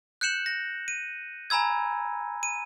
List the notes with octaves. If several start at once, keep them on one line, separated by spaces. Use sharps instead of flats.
F#6 G6 C#7 E7 F#7
A#6
D#7
G#5 A#5 B5 E6 G#6
D#7